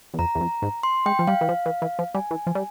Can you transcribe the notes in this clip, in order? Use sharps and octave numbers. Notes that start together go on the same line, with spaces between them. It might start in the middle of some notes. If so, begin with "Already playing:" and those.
E2
F2 A#5
E2
F2
G#2
C6
G#3 G5
F3
G3 F5
E3
F3
E3
E3
F3
G3 G#5
E3
F3
G3